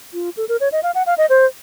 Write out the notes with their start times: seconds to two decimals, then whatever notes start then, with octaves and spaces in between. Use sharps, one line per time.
0.13 F4
0.37 A4
0.49 A#4
0.60 C#5
0.72 D#5
0.83 F5
0.95 F#5
1.06 F5
1.18 D#5
1.30 C5